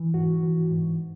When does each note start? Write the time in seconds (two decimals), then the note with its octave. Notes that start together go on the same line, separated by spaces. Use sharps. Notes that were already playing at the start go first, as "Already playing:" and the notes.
Already playing: E3
0.14 G#2 F#4
0.43 E3
0.71 G#2